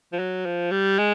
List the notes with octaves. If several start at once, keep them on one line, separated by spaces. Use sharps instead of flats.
F3
F#3
F3
G3
G#3